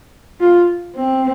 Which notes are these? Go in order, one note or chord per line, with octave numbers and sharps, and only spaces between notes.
F4
C4